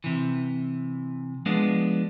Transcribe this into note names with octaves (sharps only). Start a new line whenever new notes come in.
C3 E3
F3 G#3 B3 D4